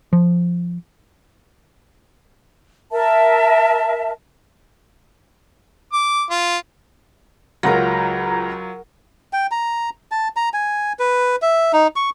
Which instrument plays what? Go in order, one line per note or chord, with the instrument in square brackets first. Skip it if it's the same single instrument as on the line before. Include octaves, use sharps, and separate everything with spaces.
[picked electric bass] F3
[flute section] A#4 E5 A5
[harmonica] D6
F4
[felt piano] C#2 A#6 [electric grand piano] F#3 F4 [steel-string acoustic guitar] A#4 F#5 [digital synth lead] A#5
[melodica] G5
A#5
A5
A#5
G#5
B4
E5
D#4
C#6